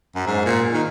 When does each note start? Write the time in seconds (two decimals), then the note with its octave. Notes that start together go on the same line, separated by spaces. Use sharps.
0.15 F#2
0.26 G#2
0.45 A#2
0.73 D#3